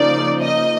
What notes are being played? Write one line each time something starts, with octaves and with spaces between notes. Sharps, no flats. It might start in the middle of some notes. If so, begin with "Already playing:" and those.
Already playing: C#3 F3 A#3 D#4 D5
D#5